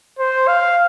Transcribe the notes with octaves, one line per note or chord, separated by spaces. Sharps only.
C5
F5